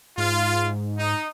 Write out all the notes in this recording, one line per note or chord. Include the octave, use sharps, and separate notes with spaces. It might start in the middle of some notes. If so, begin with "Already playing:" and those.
G#2 F4
D#4